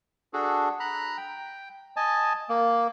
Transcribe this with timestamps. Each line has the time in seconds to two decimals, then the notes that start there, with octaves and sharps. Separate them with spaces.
0.33 D4 F#4 G#4 A4
0.80 A#5 B5 F#6
1.17 G5
1.96 D#5 G#5 A5
2.49 A#3